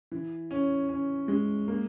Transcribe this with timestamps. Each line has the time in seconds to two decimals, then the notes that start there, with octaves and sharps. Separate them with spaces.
0.12 E3
0.51 C#4
0.89 C#4
1.28 G#3
1.68 A#3